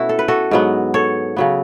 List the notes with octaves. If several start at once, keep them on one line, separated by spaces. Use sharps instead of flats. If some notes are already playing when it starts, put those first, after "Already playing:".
Already playing: B2 A3 C#4 E4 F#4
A4
B4
F#4 A4
G#2 F#3 B3
A4 C#5
C#3 F#3 B3